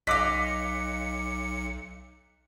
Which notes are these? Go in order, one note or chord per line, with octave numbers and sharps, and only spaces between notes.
B1 D#5 F5 D6 F#6 B6 C#7